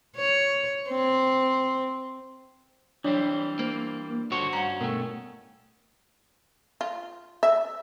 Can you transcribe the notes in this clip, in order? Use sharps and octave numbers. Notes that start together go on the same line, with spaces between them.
C#5
C4
E3 F#3 G3 C4 D4 C#5
A#3 C5
G2 D3 F#4 C5 C#5
G2 C#4 F#5 A#5
B2 A3 A#4 G5
F4
E5